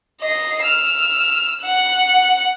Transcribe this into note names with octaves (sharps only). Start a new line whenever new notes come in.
D#5 C7
E6 F6
F#5 F#6